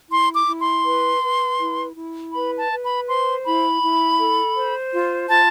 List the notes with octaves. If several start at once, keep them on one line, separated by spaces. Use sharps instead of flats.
E4 C6
D6
E4
C6
B4
B4
E4
E4
B4 B5
A5
B4
B5
C5 C6
E4 B5
E4
A4
C5
F4
F4 A5